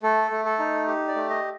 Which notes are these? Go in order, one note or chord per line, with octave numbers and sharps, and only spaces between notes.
A3 A4
A3
A4
D#4
G4
D5
A3
D#5